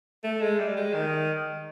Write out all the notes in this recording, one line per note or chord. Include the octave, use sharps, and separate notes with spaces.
A3
G#3
G3
G#3
D#3